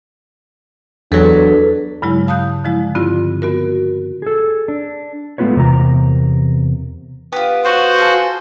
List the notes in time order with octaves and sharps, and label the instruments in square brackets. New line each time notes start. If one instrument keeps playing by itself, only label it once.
[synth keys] E2 F#3 [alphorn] D4 [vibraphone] G#4 A4 B4
[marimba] G2 C#3 F#3 G#3 E4
F5 A5 D#6 F#6 G6
D3 F3 G#3 E4
G2 D3 C4 E4 F4
B3 F#4 A#4
[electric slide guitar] G#4 A4
D4
G#3 A3 B3 F4 B4 C#5
E2 C3 A#4 A#5
[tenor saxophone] B3 [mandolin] F4 G4
[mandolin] F4 C#5 [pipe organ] F#4 C5
[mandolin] F4 G#4 A4